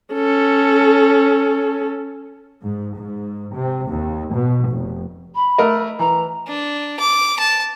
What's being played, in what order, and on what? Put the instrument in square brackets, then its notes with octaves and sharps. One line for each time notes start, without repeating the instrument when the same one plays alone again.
[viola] C#4 A4
[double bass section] G#2
G#2
C3
D#2
B2
F1
[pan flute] B5
[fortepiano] A3 A#4 D#5
[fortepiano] E3 [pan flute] A#5
[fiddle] D4
D6
A5